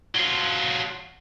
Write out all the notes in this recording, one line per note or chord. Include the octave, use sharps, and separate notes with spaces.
F#3 F4